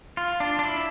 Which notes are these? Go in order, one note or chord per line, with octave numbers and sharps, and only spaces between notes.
F4
D4
D4
E4